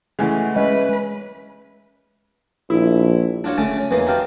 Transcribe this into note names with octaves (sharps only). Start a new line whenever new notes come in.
C#3 E3 G#3 A3 F#5
G#3 C#4 B4 E5
A#1 E4
D4 F4 F#4 C#5 F#5
C#3 A3 C#4 D5 D6
C#4
E2 E3 A#3 B3 D#4 C6
D#4 F#4 G4 F5 G5 A5